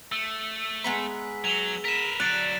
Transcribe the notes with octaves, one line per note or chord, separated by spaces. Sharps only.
A3 E6
G#3 B3 A#5 B6
F#3 F7 G7
A#4 B4 B6 E7
D3 F#3 D5 F#6 A6 D7